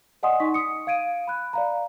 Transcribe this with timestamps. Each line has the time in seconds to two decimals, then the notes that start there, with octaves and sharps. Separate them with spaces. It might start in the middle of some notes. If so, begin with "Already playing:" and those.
0.23 D5 D#5 F#5 G#5 C6 D#6
0.40 D#4 C#6 B6
0.54 D#6 C#7
0.87 F5 G#6 D7 D#7
1.27 B5 F#6
1.53 D5 F5 A#5